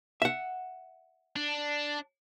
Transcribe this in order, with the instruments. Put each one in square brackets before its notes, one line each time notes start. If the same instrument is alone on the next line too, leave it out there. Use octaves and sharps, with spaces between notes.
[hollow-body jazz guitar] E5 F#5
[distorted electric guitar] D4